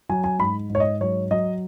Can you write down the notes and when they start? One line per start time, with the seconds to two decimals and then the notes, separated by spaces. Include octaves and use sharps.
0.10 F#3 G#5
0.24 G#5
0.39 G#2 B5
0.70 G#2
0.75 C#5
0.80 D#5
1.01 F#3 C#5
1.31 F#3 D#5